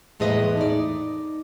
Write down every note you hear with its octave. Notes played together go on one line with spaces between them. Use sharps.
E2 A2 G#3 B4 D#5
D#4 D5